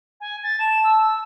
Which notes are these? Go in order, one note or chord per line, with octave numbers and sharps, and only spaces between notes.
G#5
A6
A5 E7
E6